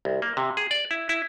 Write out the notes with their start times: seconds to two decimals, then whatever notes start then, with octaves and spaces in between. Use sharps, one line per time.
0.05 C2
0.22 A#3
0.37 C3
0.57 G#4
0.71 D5
0.91 E4
1.09 E4